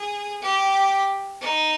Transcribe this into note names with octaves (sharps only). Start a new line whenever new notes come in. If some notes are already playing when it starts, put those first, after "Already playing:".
Already playing: G#4
G4
D#4